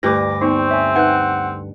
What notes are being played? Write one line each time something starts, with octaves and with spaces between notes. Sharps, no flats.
D2 G2 G4 D6 A#6
B3 C4 D#4 C5 C#6
C#5 E5 G#5
D#4 B4 F#5 G5 F#6